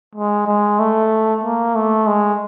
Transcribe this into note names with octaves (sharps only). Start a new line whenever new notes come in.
G#3
G#3
A3
A#3
A3
G#3